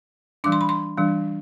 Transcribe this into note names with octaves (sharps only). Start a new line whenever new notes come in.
E3 G3 D4 D6
C6
B5
C6
E3 G3 D4